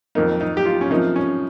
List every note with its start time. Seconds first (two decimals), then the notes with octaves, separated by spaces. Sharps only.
0.15 F2 D#3 A#3 D#4
0.41 D#4
0.57 G4
0.65 F4
0.81 C#4
0.90 C3 F3 A#3 D#4
1.16 C#4